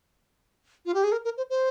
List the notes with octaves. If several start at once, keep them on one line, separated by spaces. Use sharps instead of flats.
F4
G4
G#4
A#4
A#4
C5
C5